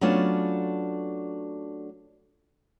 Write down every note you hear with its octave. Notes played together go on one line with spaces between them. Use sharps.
F#3 A3 B3 C#4 D4 F4